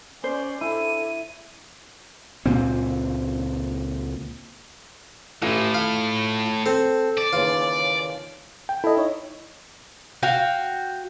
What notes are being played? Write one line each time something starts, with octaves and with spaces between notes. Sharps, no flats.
C#4 C5 D5
D4 E4 A4 D#7
C#2 A#2 C4
A1 A2 F4
F5
C4 A4
D5
D#2 C#3 E3 F4
G5
E4 A4 D#5
D#4 C#5 D#5
F#4 F5 G5